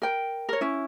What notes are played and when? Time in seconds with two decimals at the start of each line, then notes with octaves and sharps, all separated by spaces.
0.02 A#4 G5
0.49 A#4 C#5
0.61 C#4 E4